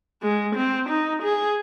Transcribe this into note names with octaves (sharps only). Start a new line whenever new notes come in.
G#3
C4
D#4
G#4